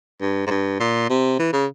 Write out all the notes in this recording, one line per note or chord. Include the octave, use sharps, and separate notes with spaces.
G2
G#2
G2
A#2
C3
E3
C#3